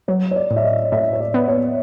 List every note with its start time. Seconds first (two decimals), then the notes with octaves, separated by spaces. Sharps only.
0.08 F#3 C#5
0.31 C#5
0.36 D5
0.51 A2
0.56 E5
0.64 D#5
0.92 A2 E5
1.13 C#5
1.20 D5
1.34 B3
1.48 C#5